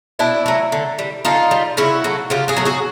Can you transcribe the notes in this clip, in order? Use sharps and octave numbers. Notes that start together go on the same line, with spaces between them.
B2 D4 E4
F#3 A3
D3
G3
D3 D#4 F4
G3
C#3 E4 F#4
F#3 A3
C#3 F4 G4
F#4 G#4
F#3 A3
F#4 G#4